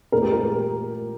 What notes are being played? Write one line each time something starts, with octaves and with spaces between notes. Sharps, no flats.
A#2 A#4
G4
A#3 A#4
A#3